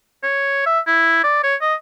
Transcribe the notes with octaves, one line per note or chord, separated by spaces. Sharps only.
C#5
E5
E4
D5
C#5
D#5